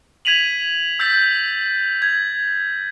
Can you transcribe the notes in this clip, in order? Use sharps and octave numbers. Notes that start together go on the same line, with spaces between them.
G#6 B6 D#7 F7 F#7
E6 G6 A6 B6
G#6